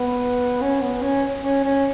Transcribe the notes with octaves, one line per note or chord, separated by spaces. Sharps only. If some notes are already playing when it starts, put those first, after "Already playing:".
Already playing: B3
C#4
B3
C#4
C#4
C#4